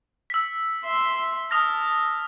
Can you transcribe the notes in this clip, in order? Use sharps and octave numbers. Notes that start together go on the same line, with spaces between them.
E6 B6
E5 C6
A5 D#6 F6 A#6